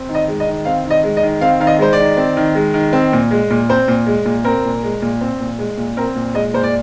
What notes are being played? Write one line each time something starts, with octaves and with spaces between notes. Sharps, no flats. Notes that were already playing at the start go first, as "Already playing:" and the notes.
Already playing: C4
D#3
D#5
G#3
D#5
D#3
C4 F5
D#3
D#5
G#3
D#5
D#3
C4 F5
D#3 F5
D#5
G#3 C5
D5
D#3
C4
D#3
G#3
D#3
C4
A#2
G#3
A#2
C4 C5
A#2
G#3
A#2
C4 A#4
A#2
G#3
A#2
C4
A#2
G#3
A#2
C4 A#4
A#2
G#3 D#5
A#2 C5
D5